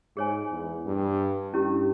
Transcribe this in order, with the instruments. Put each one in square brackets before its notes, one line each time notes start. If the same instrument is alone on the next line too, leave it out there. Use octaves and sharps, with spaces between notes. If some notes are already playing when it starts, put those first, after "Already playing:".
[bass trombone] G#2 [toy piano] G#4 C#5 G#5
[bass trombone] E2
G2
[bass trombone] G2 [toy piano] C#4 E4 G4